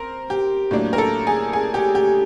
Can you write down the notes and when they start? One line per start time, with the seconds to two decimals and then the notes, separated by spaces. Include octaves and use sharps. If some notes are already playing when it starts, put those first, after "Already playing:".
Already playing: C4 A#4 C5
0.30 G4
0.71 A2 F#3 A#3 D4
0.93 A#4
0.98 A4
1.27 G#4
1.53 G#4
1.74 G4
1.95 G4